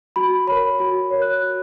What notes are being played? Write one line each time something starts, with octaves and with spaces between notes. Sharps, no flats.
F#4 B5
A#4 C#5 B5
F#4 B5
A#4 C#5
F#6
F#4